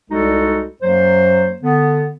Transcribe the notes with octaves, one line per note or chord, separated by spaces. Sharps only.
C2 G3 G#3 D#4 F#4 A4
F#2 F#3 A#3 C5
D3 B3